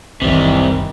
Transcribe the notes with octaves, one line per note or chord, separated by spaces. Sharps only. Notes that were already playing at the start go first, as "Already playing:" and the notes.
F#1 C2 C3 D#3 E3 G3